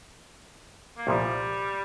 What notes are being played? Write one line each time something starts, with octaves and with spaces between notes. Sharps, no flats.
A#3
C2 A#2 F3 G3